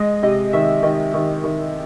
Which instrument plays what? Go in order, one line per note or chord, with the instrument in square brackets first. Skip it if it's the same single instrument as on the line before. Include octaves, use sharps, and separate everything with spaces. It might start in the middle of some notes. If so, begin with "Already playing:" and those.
Already playing: [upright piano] G#3 [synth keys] D#5
[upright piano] C3 [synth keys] D#5
[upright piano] D#3 [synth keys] E5
[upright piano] D#3 [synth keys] D#5
[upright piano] D#3
D#3